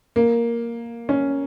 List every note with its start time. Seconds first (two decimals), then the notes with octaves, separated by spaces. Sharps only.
0.16 A#3
1.09 C#4